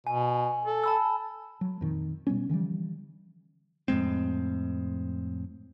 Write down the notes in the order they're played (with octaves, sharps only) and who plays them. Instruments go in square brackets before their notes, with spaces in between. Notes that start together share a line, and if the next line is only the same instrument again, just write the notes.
[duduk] B2 [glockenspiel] G#5
[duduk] A4
[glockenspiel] A5 B5 E6
[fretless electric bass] F#3
F2 A#2 D#3
B2 G3 B3 C#4
D3 E3 F3 G3
[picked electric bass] F2 A2 G#3 C4